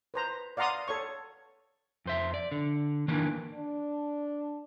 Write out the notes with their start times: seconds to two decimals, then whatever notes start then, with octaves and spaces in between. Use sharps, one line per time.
0.14 B4 C5 A#5
0.57 D5 F5 F#5 A#5 C6 D#6
0.88 A4 C#5 C#6
2.06 F2 C5 E5
2.34 D5
2.52 D3
3.08 D#3 E3 A#3 D4
3.54 D4